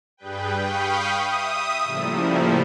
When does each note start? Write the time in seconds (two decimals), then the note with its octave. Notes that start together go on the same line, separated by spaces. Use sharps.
0.17 G2 G3 G#4 B4 G5
0.56 F5 G5 B5 C#6 D#6
1.21 E5 D#6
1.83 A2 C#3 F3 G3 A#3 E4